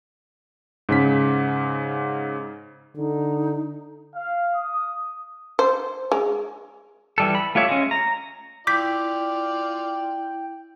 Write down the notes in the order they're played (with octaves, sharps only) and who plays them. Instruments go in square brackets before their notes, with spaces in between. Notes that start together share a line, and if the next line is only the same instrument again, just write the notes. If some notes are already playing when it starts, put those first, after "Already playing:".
[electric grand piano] G#2 C#3 B6
[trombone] D3 [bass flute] D#4
[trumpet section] F5
D#6
[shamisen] C5
G#3
[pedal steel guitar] E3 G3 A4
B5
A3 F4 G4 C#5 E5
G#3 C#4
A#5
[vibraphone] E4 [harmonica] F4 D5 [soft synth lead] G5 [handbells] D6 G6 B6